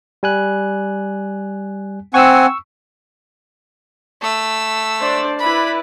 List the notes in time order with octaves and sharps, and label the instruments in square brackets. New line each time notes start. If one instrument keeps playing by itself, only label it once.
[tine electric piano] G3 G#5 F#6
[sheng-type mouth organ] C4 F#5 G#5 [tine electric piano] C#6 E6
[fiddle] A3 E6
[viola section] D4 C5 D5
[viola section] E4 B4 D5 [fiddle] B5